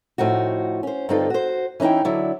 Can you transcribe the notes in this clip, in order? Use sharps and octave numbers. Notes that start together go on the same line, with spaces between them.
A2 F3 D#4 F#4
C#4 C5
G2 D3 C4 D#4 F4 A4
F#4 C5
E3 C#4 D#4 E4 G5
D3 F#3 D4 E4